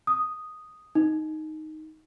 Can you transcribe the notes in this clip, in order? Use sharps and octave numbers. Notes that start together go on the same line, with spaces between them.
D#6
D#4